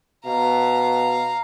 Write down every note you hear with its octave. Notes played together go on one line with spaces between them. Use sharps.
B2 F5 A#5